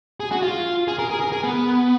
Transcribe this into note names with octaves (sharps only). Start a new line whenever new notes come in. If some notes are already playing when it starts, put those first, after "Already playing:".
G#4
F#4
F4
G#4
A#4
G#4
A#4
G#4
B3